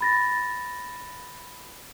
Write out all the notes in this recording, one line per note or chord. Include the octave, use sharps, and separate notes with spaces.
B5 A6 A#6